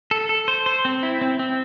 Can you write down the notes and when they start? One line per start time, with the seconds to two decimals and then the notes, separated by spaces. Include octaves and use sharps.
0.11 A4
0.29 A4
0.48 C5
0.66 C5
0.85 C4
1.03 E4
1.21 C4
1.39 C4